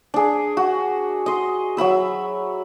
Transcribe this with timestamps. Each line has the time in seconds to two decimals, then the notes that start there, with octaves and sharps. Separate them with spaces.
0.14 D4 G#4
0.57 F#4
1.26 D#5 C6
1.77 F#3 E5 B5 E6